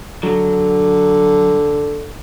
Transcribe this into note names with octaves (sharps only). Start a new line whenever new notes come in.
D3 F#3